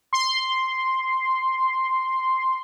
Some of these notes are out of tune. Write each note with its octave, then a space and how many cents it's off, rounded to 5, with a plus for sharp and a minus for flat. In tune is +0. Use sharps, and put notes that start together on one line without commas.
C6 +0